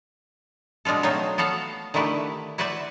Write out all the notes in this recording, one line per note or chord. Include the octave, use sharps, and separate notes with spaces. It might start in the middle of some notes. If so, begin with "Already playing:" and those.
B2 G#3 D4 F4 A4
F#3 A3 C4 D#4 F4
B3 F#4 A4 F5 F#5
D3 D#3 A3 E4 G4 B4
E4 F#4 B4 C5 D5 E5